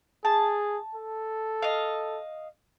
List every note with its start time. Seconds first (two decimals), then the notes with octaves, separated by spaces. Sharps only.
0.25 G#4 A5
0.95 A4
1.62 D#5 F5